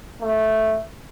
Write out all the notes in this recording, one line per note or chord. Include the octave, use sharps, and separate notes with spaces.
A3